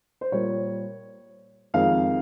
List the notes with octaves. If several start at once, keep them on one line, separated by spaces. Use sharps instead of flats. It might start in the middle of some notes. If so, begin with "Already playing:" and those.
C5
A#2 G3 A#3 C#5
F2 D#3 G#3 F5